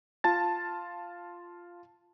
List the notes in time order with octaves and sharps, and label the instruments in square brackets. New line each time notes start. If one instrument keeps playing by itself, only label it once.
[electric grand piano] F4 A5 A6